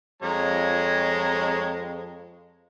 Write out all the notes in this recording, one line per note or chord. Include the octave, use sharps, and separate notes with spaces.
F2 G#3 C#5 A#5